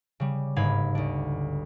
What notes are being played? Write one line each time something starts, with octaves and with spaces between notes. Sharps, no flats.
C#3 G3
G1 G#2 F5 B5 G#6
D2 D4